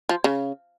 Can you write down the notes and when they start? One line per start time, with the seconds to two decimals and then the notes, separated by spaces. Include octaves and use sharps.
0.09 F3
0.24 C#3